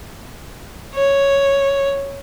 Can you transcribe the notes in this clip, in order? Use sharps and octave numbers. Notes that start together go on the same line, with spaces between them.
C#5